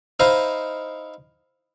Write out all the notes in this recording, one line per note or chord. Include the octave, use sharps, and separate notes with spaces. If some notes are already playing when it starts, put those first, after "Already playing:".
D#4 E4 C5 D#5 F5